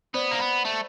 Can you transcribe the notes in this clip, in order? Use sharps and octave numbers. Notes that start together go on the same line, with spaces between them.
B3 C5 D5
A#3
B3
A3